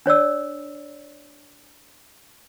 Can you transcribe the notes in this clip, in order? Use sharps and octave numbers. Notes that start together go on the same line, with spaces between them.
D4 C#5 D5 E6